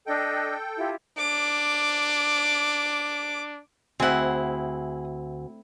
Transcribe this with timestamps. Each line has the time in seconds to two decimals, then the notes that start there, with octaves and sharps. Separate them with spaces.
0.07 D4 A4 D#5 G5
0.78 E4 F4 G4
1.17 D4 D6
4.00 D2 C4 E4 G#4 F#5